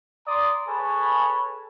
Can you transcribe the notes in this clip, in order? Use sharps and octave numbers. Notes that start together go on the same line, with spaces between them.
D5 A#5 C6 D#6
G#4 A4 B4 C#5